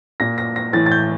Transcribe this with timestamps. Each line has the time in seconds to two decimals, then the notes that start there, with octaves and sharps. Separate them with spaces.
0.20 A#2 A#6
0.38 A#6
0.56 A#6
0.73 A2 E3 A6
0.86 A6
0.92 G6